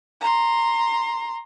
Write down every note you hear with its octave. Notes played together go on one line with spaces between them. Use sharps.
A#5 C6